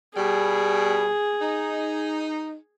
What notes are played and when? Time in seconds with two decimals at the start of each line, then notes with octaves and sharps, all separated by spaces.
0.16 B2 G3 G#4
1.41 D#4